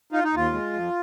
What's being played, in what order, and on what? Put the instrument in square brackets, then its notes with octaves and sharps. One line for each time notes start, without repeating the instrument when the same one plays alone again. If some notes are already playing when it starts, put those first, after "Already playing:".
[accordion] D#4 F4
D#4
D#2 F4
G#3
F2